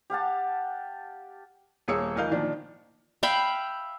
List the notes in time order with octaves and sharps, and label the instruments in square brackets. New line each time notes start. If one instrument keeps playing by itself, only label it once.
[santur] G4 F5 F#5 A5
[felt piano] D#1 A#3 G#4 C#5 E6 C#7
D2 E3 A#4 D#5 F5 G6
A#2 D#3 F3 D4
[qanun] E5 F5 G5 B5